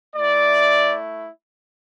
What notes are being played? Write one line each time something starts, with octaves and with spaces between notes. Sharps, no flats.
A3 E4 D5